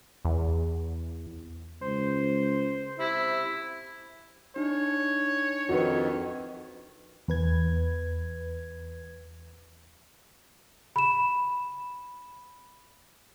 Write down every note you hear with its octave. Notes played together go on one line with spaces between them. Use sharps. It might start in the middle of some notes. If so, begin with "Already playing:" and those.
E2
C#2 C5
C3 E4
D4 D#4 C#5
F2 D#3 F#4 B4
E2 B4 G#6
B5 E7